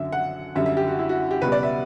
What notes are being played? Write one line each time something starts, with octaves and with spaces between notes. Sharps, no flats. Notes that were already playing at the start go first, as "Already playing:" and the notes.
Already playing: F#2 D3 F#3 E5
F#5
F#2 D3 G3 E5
E5
G4
F#4
E4
F#4
G4
C#2 B2 G3 B4
D5
E5